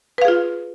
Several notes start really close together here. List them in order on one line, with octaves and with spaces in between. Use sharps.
B4 F5 G#4 F4